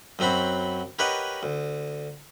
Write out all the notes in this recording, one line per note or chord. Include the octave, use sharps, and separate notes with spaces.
F#2 F#3 C4 F#4 B5
G4 A#4 B4 C#5 D#5 F#5
D2